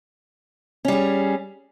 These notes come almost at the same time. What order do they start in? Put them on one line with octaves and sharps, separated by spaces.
C#4 G3 G#4